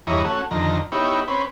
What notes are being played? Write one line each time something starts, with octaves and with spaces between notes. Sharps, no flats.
E2 G2 E3 C#5 D#5 A#5
A3 C#4 F#4
F2 D3 D#3 A#5
B3 D#4 E4 G4 C#5
C4 C#4 B4